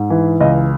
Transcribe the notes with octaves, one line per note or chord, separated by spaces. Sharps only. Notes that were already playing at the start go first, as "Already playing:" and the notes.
Already playing: G#2
E3
C#2 D#5